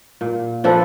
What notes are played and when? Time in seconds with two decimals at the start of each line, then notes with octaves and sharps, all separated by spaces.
0.21 A#2
0.64 F3 D4 A4 B4